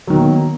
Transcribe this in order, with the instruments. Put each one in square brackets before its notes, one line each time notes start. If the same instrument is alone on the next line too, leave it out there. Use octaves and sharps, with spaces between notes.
[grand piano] F#3
D#3
B2
A#3